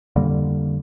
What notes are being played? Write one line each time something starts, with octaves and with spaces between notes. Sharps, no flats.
F2 D3 G3 A#3